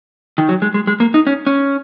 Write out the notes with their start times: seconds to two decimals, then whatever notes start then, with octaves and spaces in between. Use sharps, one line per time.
0.38 D#3
0.49 F#3
0.62 G#3
0.74 G#3
0.87 G#3
1.00 A#3
1.14 D#4
1.27 C#4
1.47 C#4